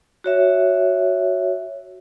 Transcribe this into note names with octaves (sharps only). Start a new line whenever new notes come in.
F#4 C#5 E5